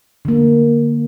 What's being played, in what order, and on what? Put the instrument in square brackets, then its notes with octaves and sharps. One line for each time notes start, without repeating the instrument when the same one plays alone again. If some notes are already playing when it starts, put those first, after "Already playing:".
[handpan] D3 A#3